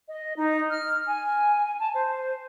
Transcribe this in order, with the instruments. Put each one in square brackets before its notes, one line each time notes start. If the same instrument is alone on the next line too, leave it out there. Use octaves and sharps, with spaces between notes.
[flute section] D#5
D#4
F6
G#5
A5
C5